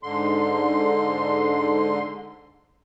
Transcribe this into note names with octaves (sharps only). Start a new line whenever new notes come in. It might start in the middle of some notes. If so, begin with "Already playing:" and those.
G#2 D3 C6